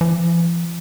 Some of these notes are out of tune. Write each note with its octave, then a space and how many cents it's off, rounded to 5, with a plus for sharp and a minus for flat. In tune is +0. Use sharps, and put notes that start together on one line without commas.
F3 -45